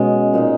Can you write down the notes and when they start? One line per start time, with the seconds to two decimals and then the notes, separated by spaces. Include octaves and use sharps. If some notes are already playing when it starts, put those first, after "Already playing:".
Already playing: B2 G#3 C#4
0.33 A#2 G#3 D#4